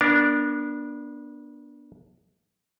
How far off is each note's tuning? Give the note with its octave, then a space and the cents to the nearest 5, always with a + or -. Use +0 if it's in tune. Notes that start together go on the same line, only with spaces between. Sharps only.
B3 -30 D4 +0 A#4 +0